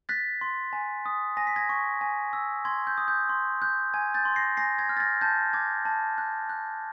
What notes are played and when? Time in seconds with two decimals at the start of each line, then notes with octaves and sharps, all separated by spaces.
0.09 F#6 A6 B6
0.41 C6
0.73 G#5
1.06 D#6
1.37 G#5 A#6
1.47 B6
1.56 G#6 A#6
1.69 C#6
2.01 G#5
2.33 E6
2.65 C6 G#6
2.87 G6
2.98 D#6
3.08 G6
3.29 C6
3.62 F#6 G6
3.94 G#5 G#6
4.14 G6 A6
4.25 C6
4.36 A#6 C7
4.57 G#5 A#6 C7
4.79 G#6 A#6
4.89 F6
4.97 A6
5.00 G#6 A#6
5.21 A5 G6 A6
5.53 D6 G#6
5.85 A5
6.18 F#6
6.49 F#6